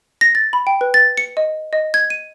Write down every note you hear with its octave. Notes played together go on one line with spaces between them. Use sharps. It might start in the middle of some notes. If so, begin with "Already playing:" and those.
A#6
A6
B5
G5
B4
A6
C#7
D#5
D#5
G#6
D#7